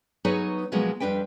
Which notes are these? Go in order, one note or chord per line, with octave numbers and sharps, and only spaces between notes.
F#3 B3 D#4 G#4 B4 C#5
B2 F3 F#3 G#3 A#3 B3
F2 G#2 G3 D4 B4 G5